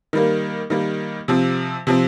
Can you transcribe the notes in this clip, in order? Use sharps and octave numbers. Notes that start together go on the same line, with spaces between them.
D#3 G3 A#3
D#3 G3 A#3
C3 F3 C4
C3 F3 C4